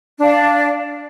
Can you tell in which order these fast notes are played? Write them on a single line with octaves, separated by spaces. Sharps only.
D4 F5 D5